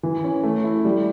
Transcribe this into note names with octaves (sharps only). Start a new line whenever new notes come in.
E3
C#4
A3
E4
G3